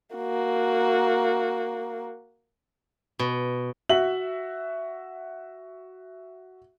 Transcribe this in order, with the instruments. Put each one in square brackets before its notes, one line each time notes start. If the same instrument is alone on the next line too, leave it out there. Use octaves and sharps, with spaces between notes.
[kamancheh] A#3 F#4
[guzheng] B2
[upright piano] F#4 E5 F#7